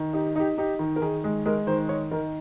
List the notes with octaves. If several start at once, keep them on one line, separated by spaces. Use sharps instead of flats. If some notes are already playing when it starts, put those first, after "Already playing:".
Already playing: D#3
D#4 G4
D#4 G4
D#4 G4
D#3
A#4
D#3 G#4
G#3
G#3 A#4
D#3 C5
D#3 C#5
D#3 A#4